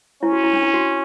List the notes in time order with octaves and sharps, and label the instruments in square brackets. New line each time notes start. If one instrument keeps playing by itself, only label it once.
[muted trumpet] C#4 [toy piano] E4
[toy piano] F#4
E4
D4
E4
F#4